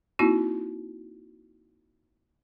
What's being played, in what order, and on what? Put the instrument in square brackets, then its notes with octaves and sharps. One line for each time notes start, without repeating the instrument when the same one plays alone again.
[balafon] A#3 C4 D#4 E4 F#4